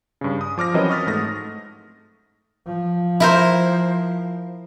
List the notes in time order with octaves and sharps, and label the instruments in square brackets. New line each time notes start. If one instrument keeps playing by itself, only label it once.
[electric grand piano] G2 C#3
D#6
F3 D6 F6 A#6
E3 F#3 C4 C#4 A#4 D#5
C#6 D#6 F6 A6 B6
G#2 A3 D#6 A#6
[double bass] F3
[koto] E4 A#4 C5